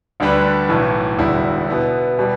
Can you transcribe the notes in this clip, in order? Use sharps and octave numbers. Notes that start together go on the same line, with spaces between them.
D2 D3 G3 D4 B4
B1 A2 E3
E1 E2 D3 G3 E4
B2 B3 E4
B2 G3